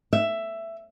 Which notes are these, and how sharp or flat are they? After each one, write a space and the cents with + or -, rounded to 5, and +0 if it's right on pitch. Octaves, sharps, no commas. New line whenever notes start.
E5 +10